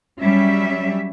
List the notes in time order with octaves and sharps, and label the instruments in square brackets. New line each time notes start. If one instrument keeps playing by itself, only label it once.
[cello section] F#3 G3 C#4 E5